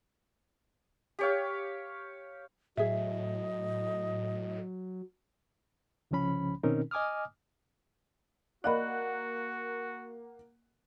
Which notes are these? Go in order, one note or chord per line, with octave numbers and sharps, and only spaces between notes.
G4 C#5 F5
A2 F#3 G#4 D#5 E5
C2 C#3 F3 C#4 B5
B2 D#3 C4 C#4 D#4 A#4
D#5 G#5 D6 D#6 F6
A#3 F#4 D5 D#5 F#5 B5 F#6